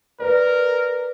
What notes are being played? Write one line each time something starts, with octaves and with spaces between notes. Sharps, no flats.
A#4 B4 D5